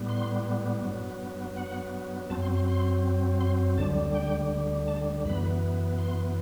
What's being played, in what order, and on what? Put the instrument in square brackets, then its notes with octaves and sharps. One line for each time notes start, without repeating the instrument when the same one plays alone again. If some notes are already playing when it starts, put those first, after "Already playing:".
Already playing: [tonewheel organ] A2 G3 B3
C6
G2 F#3 B3
F#5
F#2 F#3 C4 A5
C6
C6
C6
C6
D2 D3 G3 A5
G5
A5
F#2 E3 B3 B5
C6